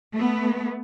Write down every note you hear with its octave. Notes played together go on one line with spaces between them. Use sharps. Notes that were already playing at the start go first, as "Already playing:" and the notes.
A3 B3